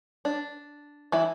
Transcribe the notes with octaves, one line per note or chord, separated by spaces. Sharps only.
D4
E3 E4